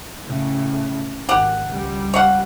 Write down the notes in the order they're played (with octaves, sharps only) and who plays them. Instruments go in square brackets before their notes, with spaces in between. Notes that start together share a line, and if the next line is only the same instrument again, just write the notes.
[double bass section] A2 C#3
[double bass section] G#1 [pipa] G4 F#5
[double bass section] C#2 G3
[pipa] C#5 F5 F#5